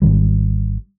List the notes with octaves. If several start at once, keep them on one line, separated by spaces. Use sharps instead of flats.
G#1 D#2 D#3 G3